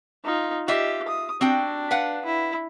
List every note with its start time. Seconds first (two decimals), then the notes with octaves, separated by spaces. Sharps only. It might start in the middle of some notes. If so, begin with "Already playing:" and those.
0.24 D#4 F4
0.68 F4 G4 D#5 E5
1.08 D#6
1.41 C4 D4 F#4 G5
1.91 B4 F5 F#5
2.25 E4